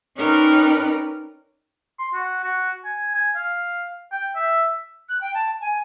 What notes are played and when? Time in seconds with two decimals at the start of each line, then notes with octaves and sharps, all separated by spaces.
0.17 C#4 D#4 A#4 B4 D5 G5
1.99 C6
2.14 F#4
2.44 F#4
2.85 G#5
3.15 G#5
3.36 F5
4.12 G5
4.36 E5
5.09 F#6
5.21 G5
5.34 A5
5.61 G#5